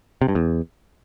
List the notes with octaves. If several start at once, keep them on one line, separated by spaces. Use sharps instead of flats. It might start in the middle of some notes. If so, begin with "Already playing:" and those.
C3
G2
E2